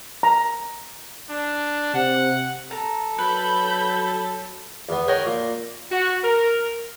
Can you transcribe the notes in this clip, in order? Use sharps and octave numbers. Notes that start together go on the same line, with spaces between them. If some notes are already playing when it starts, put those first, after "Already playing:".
A#5
D4
C3 F#5
A4 A#5
F#3 B4 B5 G6
E2 B3
A#4 C#5 D#5 F#5 G5
A#2
F#4
A#4